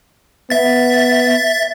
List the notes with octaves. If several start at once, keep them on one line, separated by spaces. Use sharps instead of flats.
B3 E5 A6